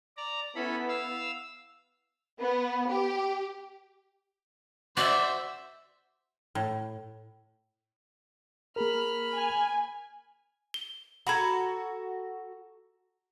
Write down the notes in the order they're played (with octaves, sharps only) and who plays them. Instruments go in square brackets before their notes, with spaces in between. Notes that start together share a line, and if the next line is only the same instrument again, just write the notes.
[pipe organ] D5 A#5
[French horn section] B3 E4 [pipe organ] C#4 A4 B5
[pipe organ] F5 E6
[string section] B3
G4
[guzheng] F#4 [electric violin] C5 E5 [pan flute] D5 [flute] D6
[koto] A2
[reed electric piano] A#3 G#4 A#4 [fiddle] B5 F6
[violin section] G#5
[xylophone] G7
[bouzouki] F#4 A4 [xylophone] A#5 B5 G#6